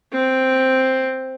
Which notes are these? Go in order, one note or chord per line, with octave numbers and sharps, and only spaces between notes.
C4